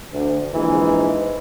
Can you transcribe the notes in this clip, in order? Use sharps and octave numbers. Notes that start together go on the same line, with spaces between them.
D2
A#1 G#2 E3